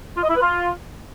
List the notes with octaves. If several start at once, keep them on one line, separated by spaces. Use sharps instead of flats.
F4
D#5
E4
B4
F4